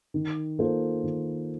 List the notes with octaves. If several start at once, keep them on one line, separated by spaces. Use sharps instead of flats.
D#3
A#3 F4 A4 C5
D#3